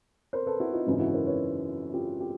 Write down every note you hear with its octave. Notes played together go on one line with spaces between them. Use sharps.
A#4 C5
A4 B4
E4 F#4
D#4 F4
G#1 F#2 C#3 E3 D#4 F4
E4 F#4
A#4 C5
B4 C#5
F4 G4
F4 G4